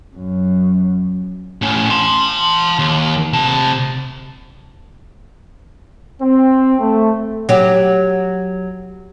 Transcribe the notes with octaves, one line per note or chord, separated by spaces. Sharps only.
F#2
A2 C#4
A5 C6
D#2
C3 A5
C4
A3
F#3 G4